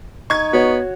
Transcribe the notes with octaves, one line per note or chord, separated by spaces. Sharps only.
D#4 C#6 G#6
B3 F#4 C#5